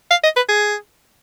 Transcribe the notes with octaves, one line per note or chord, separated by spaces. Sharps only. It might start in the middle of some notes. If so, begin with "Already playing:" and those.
F5
D#5
B4
G#4